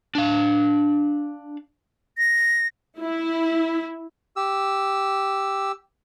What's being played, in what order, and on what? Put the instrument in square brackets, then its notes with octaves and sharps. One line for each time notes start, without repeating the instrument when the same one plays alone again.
[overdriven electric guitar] D4 F5
[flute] A#6
[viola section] E4
[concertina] G4 E6